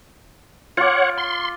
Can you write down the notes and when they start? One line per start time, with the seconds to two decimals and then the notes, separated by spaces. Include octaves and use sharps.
0.77 F4 C#5 F#5 D6
1.18 C6